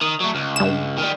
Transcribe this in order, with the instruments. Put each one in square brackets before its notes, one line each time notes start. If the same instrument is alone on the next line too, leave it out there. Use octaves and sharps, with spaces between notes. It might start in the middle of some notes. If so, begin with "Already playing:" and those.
[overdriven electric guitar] D#3 [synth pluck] D#6
[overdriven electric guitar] F#3 A3
C#2
[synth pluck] G2 E7
[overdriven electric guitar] D#3 G3